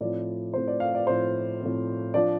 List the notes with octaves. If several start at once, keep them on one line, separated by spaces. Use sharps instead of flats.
A2 F3 C4 D5
A2 F3 C4 C5
D5
F5
D5
A2 F3 C4 C5
A2 F3 C4
F3 D4 D5